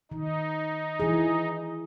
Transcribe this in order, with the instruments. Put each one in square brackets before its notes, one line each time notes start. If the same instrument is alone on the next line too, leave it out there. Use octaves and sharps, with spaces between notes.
[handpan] D#3 [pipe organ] D#4
[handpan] E3 G#4